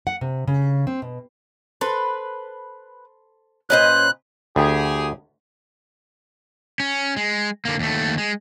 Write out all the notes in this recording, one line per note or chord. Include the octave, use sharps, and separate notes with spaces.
F#5
C3
C#3
C4
B2
A4 B4 C5
A#2 C#4 B4 C5 D#5 F#6
D2 G4 G#4
C#4
G#3
D3 A#3
D#2 A3
G#3